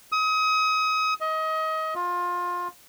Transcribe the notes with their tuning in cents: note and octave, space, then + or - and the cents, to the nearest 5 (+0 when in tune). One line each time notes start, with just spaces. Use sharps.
D#6 +30
D#5 +25
F4 +20